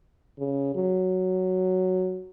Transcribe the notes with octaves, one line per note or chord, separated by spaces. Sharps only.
C#3
F#3